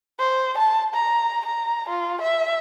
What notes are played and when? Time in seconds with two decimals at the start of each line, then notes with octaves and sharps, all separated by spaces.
0.19 C5
0.57 A5
0.94 A#5
1.45 A#5
1.89 F4
2.21 E5